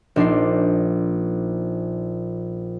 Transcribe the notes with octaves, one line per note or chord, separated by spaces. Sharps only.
A#1 D4 D#4 C7